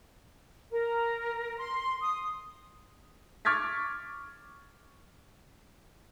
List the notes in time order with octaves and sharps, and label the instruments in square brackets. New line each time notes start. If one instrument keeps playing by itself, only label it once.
[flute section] A#4
C6
D#6
[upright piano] C#6 D6 F6 G#6 A6 B6